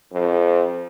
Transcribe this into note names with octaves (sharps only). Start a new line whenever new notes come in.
F2